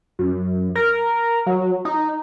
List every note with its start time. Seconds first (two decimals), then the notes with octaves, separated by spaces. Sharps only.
0.19 F#2
0.75 A#4
1.47 F#3
1.85 D#4